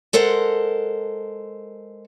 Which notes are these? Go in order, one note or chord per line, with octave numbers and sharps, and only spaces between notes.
G#3 A4 A#4 C5 F#5